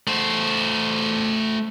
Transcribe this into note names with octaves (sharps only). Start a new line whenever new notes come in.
A3 C5